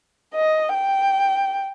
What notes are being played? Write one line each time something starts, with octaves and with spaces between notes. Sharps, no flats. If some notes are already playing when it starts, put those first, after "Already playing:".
D#5
G5